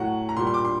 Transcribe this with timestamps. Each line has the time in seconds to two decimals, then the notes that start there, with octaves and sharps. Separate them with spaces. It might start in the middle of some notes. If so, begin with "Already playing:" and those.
Already playing: A2 F#3 F#5
0.29 A#5
0.37 A#2 G3 C6
0.47 C6
0.54 D6
0.65 C6